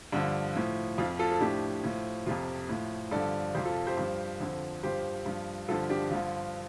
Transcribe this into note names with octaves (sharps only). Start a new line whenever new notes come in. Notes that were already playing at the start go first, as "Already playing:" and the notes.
G2 D3 F3 D4
A2 F3
F2 F3 F4
F4 A4
A4
A2 F3 D4 G4
A2 F3
F2 C3 F3 F4
A2 F3
G2 D3 F3 A4 D5
F2 C3 F3 G4 C5
F4 A4
G4 C5
G2 F3
F2 D3 F3
G2 F3 G4 C5
G2 F3
G2 D3 F3 F4 A4
D4 G4
G2 D3 F3 F4